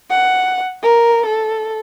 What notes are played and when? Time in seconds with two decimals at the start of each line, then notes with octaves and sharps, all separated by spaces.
0.10 F#5
0.83 A#4
1.26 A4